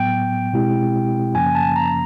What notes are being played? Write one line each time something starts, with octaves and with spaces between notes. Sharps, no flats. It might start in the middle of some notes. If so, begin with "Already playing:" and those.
Already playing: A2 F#3 B3 G5
B2 G#3 C4 E4 G4
F#2 C#3 F3 A#3 C#4 G#5
A5
A#5